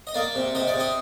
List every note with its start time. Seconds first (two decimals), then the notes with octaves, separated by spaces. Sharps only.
0.07 D#5
0.14 A#3 D5
0.35 C3
0.55 C3 D#5
0.68 D5
0.74 C3
0.80 D#5